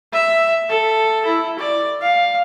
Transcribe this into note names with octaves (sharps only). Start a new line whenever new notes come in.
E5
A4
E4
D5
F5